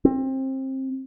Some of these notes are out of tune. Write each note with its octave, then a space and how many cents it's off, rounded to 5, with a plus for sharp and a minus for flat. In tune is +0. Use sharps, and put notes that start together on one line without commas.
C4 +25